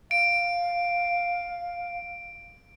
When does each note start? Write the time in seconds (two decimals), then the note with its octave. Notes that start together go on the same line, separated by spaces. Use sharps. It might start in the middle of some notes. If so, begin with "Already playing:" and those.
0.11 F5 D7